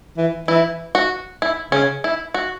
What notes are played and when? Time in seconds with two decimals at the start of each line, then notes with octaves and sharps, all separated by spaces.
0.17 E3
0.48 E3 E4
0.95 F#4
1.42 E4
1.72 C#3 C#4
2.04 E4
2.34 F#4